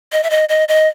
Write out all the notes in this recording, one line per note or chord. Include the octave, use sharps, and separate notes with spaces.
D#5
E5
D#5
D#5
D#5